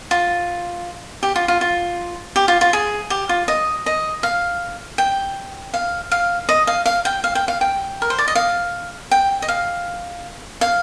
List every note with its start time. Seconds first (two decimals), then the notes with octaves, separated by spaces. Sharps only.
0.11 F4
1.23 G4
1.36 F4
1.48 F4
1.61 F4
2.36 G4
2.48 F4
2.61 F4
2.73 G#4
3.10 G4
3.29 F4
3.48 D#5
3.86 D#5
4.23 F5
4.98 G5
5.74 F5
6.11 F5
6.49 D#5
6.67 F5
6.86 F5
7.05 G5
7.24 F5
7.35 G5
7.48 F5
7.61 G5
8.02 A#4
8.10 C5
8.18 D5
8.28 D#5
8.35 F5
9.11 G5
9.42 D#5
9.48 F5
10.61 F5